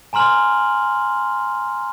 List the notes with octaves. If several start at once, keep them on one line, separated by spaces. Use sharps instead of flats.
G#5 A#5 C6 F6 F#7